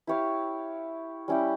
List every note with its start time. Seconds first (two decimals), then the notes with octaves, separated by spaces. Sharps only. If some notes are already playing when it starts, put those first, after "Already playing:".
0.07 E4 G4 C#5 F5
1.28 G3 C#4 E4 G4